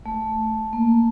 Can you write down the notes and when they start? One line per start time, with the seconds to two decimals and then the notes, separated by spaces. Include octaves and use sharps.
0.06 A3
0.73 A#3